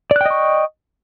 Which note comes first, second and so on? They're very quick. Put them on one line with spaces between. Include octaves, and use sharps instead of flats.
D5 F#6 G5 D#5 C#6